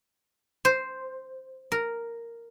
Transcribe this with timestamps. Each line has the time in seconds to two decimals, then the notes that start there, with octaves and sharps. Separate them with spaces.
0.65 C5
1.72 A#4